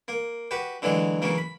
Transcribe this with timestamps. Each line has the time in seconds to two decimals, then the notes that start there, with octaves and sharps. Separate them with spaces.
0.08 A#3
0.51 F#4 G4 B4
0.82 D3 E3 F#3 G#3
1.22 C#3 E3 F#3 A#3
1.38 B5